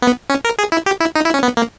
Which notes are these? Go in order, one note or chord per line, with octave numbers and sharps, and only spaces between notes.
B3
C#4
A#4
G#4
E4
G4
E4
D#4
E4
C#4
B3
A#3